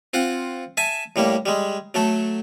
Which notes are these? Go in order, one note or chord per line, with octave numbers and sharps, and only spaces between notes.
C4 F4 F#5
E5 G#5 A5
A2 G3 A#3
G3 G#3
F#3 A3 A4